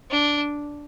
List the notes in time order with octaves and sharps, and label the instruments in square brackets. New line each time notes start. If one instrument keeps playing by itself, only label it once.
[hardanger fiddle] D4